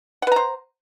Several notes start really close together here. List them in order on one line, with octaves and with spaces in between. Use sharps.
F#5 B4 A#5 C5